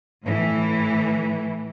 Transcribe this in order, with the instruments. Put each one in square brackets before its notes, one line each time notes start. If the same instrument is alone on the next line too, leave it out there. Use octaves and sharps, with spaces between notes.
[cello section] A2 E3